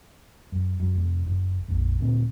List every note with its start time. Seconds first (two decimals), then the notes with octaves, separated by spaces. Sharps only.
0.52 F#2
0.80 F#2
0.95 F1
1.26 F#1
1.68 A#1 F2
1.99 D2 A#2 C4